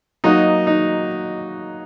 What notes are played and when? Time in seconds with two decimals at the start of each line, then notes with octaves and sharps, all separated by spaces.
0.24 F#3 A#3 D#4 F#4 D#5
0.67 D#4